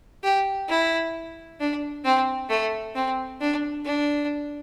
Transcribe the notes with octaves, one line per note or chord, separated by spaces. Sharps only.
G4
E4
D4
C4
A3
C4
D4
D4